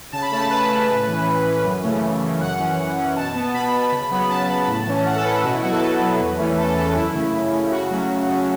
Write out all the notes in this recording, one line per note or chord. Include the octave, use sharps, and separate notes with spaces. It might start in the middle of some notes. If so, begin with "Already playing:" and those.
C#3 A5
B5
A3 C#4 A5
C#3 B4
A3 C#4
A2
E3 C#4
A2
E3 C#4
F#2
C#3 E3 A3 C#4
F#2
C#3 E3 A3 C#4
F#2 F#5
E3 C#4
F#2
E3 C#4
B2 A5
B3
B2 B5
B3
C#3
F#3 B3
C#3 A5
F#3 B3
A2
E3 C#4
A2 F#5
A4
E3 C#4 B4
A4
B2 F#4
E4
F#3 B3 F#4
A4
B2 B4
F#3 B3
E2
E3 A3 C#4
E2 A4
E3 A3 C#4 A4
F#2 E4
C#3 A3 C#4
F#2
C#3 A3 C#4
C#3 F#4
F#3 A3 C#4
C#3
F#3 A3 C#4